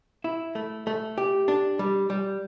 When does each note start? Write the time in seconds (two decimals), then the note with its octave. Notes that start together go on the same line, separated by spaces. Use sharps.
0.24 E4
0.55 A3
0.87 A3
1.18 G4
1.48 D4
1.79 G3
2.10 G3